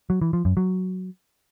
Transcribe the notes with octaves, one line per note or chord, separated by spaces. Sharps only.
F#3
E3
F3
F#2
F#3